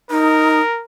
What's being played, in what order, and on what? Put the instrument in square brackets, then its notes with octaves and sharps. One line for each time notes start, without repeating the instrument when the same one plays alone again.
[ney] D#4 [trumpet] A#4